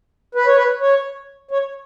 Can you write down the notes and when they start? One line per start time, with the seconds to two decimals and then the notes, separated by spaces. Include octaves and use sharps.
0.35 B4
0.46 C#5
0.55 B4
0.81 C#5
1.51 C#5